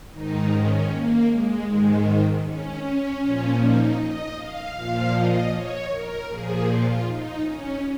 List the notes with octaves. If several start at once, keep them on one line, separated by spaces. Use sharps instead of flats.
G#2 D#3 D#4
C#4
A#3
G#3
G#2 D#3 G#3
C#4
C#4
A#2 F3 C#4
D#4
D#5
F5
A#2 F3 F5
D#5
C#5
A#4
A#2 F3 G#4
F4
D#4
C#4